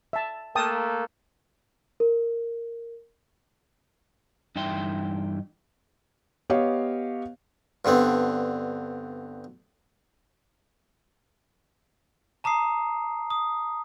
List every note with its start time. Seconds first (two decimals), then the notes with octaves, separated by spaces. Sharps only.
0.13 E5 A5
0.55 A3 A#3 G5 A5 D#6
2.00 A#4
4.56 G2 E3 D#4 E5 G5 C6
6.50 B3 G4 C#5 D#5 F5
7.85 G2 D3 B3 C4
12.44 A5 A#5 D6 D#6 C7
13.30 D#6